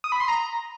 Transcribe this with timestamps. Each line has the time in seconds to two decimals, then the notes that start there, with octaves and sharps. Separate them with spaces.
0.04 D#6
0.12 B5
0.20 C6
0.28 A#5